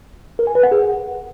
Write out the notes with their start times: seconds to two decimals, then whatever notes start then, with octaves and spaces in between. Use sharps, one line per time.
0.39 A#4
0.47 G#5
0.55 B4
0.63 F#5
0.71 G#4